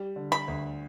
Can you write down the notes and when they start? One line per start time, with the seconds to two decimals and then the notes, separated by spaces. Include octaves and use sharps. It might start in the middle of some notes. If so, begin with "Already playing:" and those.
Already playing: G3
0.16 D3
0.32 B5
0.48 D2